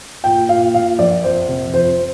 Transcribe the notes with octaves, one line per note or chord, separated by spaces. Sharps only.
A#2 G5
A#2 F5
A#2 F5
A#1 D5
F2 C5
C3
F2 C5
C5